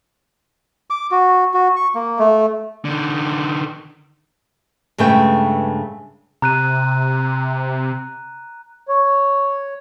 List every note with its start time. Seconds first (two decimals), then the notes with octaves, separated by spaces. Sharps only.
0.90 D6
1.11 F#4
1.54 F#4
1.76 C#6
1.95 A#3
2.19 A3
2.85 D3 D#3
4.98 G2 C#3 G#3 A3 B4 G5
6.42 C3 A#5 F#6 D#7
8.88 C#5